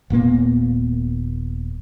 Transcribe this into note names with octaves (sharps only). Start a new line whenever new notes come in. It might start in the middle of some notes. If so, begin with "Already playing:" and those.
D#1 A#2 A#3 B3